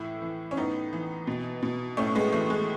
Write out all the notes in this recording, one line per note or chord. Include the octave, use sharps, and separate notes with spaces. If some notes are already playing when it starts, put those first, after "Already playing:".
Already playing: A2 E3 E4
E3
C#4
A2 B3 D#4
E3
B2
B2
A2 A3 C#4
G#3 B3
E3 A3
G#3